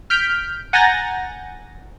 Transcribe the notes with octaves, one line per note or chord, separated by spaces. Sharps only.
F6 G6 B6 D7
F#5 G#5 A#5 G6 A6 A#6